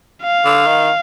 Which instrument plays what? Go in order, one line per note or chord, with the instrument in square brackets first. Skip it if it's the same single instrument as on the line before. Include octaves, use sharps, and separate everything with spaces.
[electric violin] F5
[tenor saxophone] D3
D#3